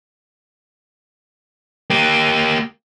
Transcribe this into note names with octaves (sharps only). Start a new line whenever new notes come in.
A#3 G4